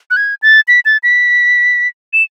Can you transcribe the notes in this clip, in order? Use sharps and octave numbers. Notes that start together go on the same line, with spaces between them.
F#6
G#6
A6
B6
A6
B6
E7